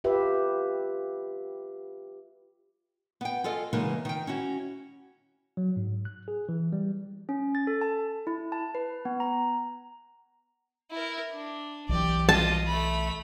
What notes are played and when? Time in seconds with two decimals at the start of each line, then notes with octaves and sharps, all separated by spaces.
0.04 F4 G4 B4 E5
3.21 B3 G5
3.44 F4 G#4 A4 D#5
3.73 C#3 E3 G#3 A#3 B3 D#4
4.05 D#3 G5
4.27 C#4 E4 F#4
5.57 F#3
5.76 G#2
6.05 F#6
6.28 G#4
6.49 E3
6.73 G3
7.29 C#4
7.55 A6
7.67 A4
7.81 A5
8.27 E4
8.52 A5
8.75 B4
9.05 B3
9.20 A#5
10.91 E4 A#4
11.32 D4
11.89 B1 E3 G4 D5
12.29 F4 D#5 A5
12.67 A3 B5